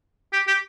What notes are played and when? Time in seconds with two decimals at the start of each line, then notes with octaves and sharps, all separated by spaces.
0.33 G4
0.48 G4